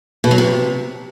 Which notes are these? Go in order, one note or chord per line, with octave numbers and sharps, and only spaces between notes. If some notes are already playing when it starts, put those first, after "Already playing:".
B2
F#3
C3